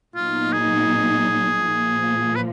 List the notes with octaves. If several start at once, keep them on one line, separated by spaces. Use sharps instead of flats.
A#2 F#3 B3 D#4 F4
G#4
A#2 F3 A#3
B4